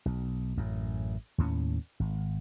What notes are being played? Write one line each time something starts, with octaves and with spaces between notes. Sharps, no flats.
B1
A1 F#2
D#2 A2 G3 C#4
G#1